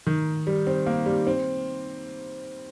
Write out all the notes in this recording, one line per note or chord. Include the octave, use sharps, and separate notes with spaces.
D#3
G3
C4
A#3
G3
C4